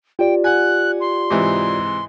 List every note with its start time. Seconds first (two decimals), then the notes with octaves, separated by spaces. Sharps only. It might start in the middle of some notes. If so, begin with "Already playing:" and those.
0.19 F4 G4 D5 G5
0.44 F#5 G#5 F#6
1.01 C6
1.30 G#2 C3 E3